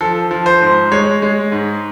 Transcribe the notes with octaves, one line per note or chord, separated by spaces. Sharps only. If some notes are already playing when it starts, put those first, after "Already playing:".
F3 A4
F3
C5
G#2
G#3 C#5
G#3
G#2